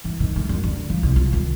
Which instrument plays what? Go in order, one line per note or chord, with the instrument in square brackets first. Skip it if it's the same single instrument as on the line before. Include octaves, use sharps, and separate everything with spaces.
[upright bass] E3
D#3
A3
F#2
D2
F3
C2
F4
D#3